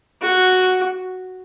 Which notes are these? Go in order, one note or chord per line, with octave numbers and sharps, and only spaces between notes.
F#4